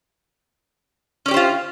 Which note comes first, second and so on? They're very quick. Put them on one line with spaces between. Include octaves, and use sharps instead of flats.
C#4 D5 G4 C5 F4